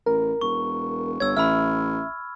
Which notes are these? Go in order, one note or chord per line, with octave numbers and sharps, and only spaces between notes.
A1 A#4
E1 C#6
G1 C#5 E6 G#6
A1 E5 B5 E6 F6